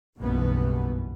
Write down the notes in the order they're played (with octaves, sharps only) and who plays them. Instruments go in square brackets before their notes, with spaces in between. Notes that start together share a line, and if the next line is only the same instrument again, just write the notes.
[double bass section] F#1 B1 G2 B2 E3 B3